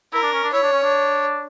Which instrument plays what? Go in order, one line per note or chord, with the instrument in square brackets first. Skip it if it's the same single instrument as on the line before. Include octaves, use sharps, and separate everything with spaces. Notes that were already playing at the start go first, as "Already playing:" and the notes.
[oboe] E4 [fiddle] A#4
[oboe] D4
C#4
D4
[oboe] E4 [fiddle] C#5
[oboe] D4
C#4
D4